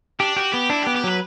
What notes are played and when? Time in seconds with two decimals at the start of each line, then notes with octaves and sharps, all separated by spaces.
0.20 D4 G4
0.36 F#4 G4
0.53 B3 G4
0.70 D4 E4
0.83 B3 G4
0.96 G4
1.04 F#3 B4